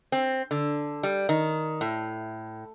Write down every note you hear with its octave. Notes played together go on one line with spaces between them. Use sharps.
C4
D3
G3
D#3
A2